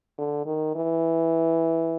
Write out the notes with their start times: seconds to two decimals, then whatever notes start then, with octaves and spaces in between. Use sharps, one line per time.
0.18 D3
0.46 D#3
0.76 E3